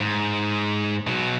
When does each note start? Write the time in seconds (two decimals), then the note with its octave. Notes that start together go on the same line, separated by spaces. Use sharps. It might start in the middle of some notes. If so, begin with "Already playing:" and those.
0.01 G#2
1.07 B2 F#3